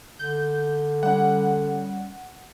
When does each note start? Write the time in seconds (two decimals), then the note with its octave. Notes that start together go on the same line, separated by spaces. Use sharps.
0.19 D3 G6
1.03 G3 C#4 F#5